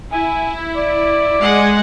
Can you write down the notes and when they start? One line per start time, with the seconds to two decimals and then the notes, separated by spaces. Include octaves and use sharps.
0.12 E4 G#5
0.77 D5
1.41 G#3 F#5